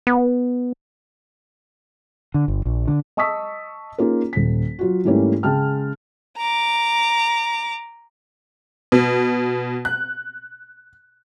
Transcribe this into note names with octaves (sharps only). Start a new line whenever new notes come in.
B3
D3
G1
A#1
D3
D#5 A5 C#6 D#6 E6 B6
A#3 C#4 D#4 F4 G#4 A#4
D#1 B6
F#3 F4 F#4
G#2 E3 G3 A3 A#3 C#4
C#3 G#3 G5 A5 F6
A#5 D6
B2
F#6